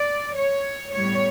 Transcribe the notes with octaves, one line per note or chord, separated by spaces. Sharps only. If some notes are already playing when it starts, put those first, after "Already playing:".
Already playing: D5
C#5
A2 G3 B3 C#5